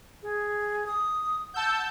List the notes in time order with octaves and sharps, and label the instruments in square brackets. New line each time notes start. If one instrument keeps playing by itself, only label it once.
[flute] G#4
D#6
[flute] F#5 [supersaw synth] A5 E6 G6